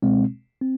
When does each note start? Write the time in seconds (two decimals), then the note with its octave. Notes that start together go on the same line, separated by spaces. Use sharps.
0.02 B2 G#3 C4
0.62 C4